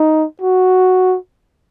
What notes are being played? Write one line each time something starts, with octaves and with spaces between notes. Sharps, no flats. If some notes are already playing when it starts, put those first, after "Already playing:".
Already playing: D#4
F#4